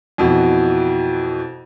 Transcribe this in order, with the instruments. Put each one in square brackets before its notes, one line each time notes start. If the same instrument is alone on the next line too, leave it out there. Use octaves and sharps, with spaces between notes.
[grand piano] F2 B2 E3